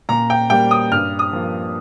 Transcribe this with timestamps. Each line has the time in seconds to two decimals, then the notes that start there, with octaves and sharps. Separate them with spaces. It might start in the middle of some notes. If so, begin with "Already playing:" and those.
0.09 A#2 A#5
0.30 G5
0.50 G3 A#3 G5
0.71 D#6
0.91 G2 F6
1.19 D#6
1.33 F3 A#3